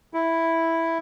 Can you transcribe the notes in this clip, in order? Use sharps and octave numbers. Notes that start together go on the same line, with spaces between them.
E4